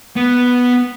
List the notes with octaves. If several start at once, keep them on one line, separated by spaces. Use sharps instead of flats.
B3